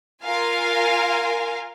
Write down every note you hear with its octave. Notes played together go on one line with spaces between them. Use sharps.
F4 A#4 F5 G#5